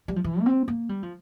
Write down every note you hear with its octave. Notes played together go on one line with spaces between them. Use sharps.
G3
F3
E3
A#3
C4
A#3
G3
F3